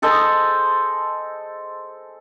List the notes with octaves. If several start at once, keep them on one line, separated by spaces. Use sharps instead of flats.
G#4 A4 C5 D#5